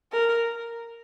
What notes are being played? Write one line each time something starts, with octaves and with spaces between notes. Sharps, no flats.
A#4